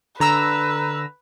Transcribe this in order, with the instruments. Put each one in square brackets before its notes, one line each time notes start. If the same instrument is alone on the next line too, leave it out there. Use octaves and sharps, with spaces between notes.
[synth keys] D3 A#5 E6 [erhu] B4